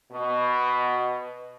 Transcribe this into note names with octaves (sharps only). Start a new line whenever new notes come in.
B2